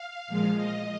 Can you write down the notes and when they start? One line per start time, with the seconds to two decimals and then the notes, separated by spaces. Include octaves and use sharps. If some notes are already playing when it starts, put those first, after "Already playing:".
Already playing: F5
0.28 A#2 F3 G#3
0.58 D#5